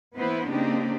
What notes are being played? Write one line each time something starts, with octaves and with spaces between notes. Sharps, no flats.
E3 A#3 B3 E4 B4 C5
C#3 A#3 C4 D4 D#4 G4